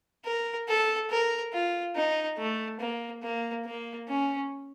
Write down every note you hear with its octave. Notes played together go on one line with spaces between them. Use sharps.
A#4
A4
A#4
F4
D#4
A3
A#3
A#3
A#3
C#4